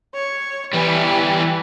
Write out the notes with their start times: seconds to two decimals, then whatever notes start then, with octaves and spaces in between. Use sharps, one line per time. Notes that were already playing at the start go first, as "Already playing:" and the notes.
0.14 C#5
0.73 E3 G3 B3 G4